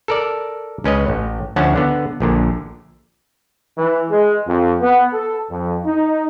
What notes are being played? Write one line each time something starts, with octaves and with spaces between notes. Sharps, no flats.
A4 A#4 D5
C#2 C#4 B4 D#5
A1
D2 D3 F3 C#4 F#5 A5
D3 B3
A#1 A#2 D3
E3
G#3
F2
B3
A4
F2
D#4